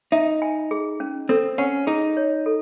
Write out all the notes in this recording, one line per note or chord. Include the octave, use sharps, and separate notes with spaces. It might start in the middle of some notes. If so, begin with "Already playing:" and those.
D#4 E5
G#5
G#4
C#4
C4 A4
C#4 F#5
D#4 G#4
C#5
A4